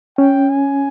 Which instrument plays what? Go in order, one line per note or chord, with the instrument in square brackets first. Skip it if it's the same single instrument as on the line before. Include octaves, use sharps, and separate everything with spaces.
[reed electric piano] C#4 [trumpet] G5
[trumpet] G#5